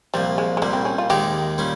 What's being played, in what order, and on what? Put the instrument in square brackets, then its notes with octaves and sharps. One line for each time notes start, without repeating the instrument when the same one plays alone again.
[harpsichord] C2 A#2 F3 [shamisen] G3
[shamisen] G#3
G#3
[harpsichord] C2 A#2 G3 [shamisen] A#3
[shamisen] C4
C#4
F4
[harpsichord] D#2 D#3 G#3 D#4 [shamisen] G4
[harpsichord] A#2 G3 C#4